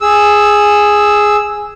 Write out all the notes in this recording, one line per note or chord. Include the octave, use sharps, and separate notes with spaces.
G#4 E6